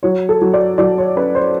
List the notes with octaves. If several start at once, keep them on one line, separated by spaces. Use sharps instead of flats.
F#3 C#5
A4
F#3
D5
F#3 D5
C#5
C#4 B4
C5